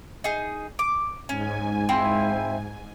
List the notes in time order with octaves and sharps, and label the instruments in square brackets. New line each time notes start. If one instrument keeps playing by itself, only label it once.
[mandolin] D#4 G#4
D6
[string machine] G#2 G#5 [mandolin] C#4
[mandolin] C4 E4 F4